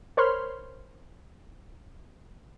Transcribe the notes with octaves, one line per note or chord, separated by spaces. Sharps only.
A#4 C5 C#5 B5 C6 F6